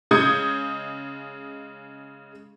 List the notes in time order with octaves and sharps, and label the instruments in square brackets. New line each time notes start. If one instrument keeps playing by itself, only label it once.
[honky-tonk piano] C#3 G#3 D#6 G6 G#6 C#7